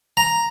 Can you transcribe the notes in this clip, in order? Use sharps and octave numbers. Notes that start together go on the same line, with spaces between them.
A#5